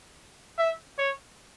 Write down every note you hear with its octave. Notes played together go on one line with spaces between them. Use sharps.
E5
C#5